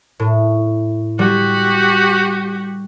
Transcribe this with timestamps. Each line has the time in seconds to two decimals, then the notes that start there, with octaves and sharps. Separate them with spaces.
0.19 A2
1.19 G3 F#4 G4